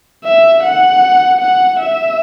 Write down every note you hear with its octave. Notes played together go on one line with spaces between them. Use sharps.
E5
F#5
F#5
E5